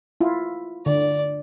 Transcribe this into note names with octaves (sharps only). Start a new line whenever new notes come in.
E4 F4
D3 D5